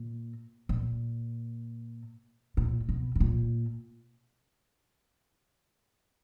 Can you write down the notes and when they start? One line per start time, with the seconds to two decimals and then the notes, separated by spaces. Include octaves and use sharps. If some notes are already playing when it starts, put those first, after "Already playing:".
Already playing: A#2
0.69 A#2
2.57 A#2
2.89 B2
3.15 G#2
3.20 A#2